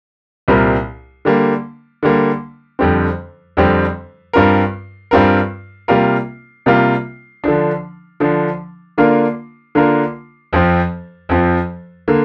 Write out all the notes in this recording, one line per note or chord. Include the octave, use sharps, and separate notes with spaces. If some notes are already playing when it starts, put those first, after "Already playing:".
C2 A#2 G3 C4 A#4
D3 G3 A#3
D3 G3 A#3
F2 D3 G3 C4
F2 D3 G3 C4
G2 G3 C4 F4 A#4
G2 G3 C4 F4 A#4
C3 G3 A#3 F4 A#4
C3 G3 A#3 F4 A#4
D3 F3 D4
D3 F3 D4
D3 A#3 D4 F4 A#4
D3 A#3 D4 F4 A#4
F2 F3 C4
F2 F3 C4
D3 A#3